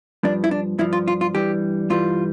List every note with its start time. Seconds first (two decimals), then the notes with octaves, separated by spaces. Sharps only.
0.23 G2 F3 D4
0.44 E4
0.51 D4
0.79 G2 F3 E4
0.93 F4
1.08 F4
1.21 F4
1.35 G2 E3 G3 G4
1.90 G2 E3 G3 F4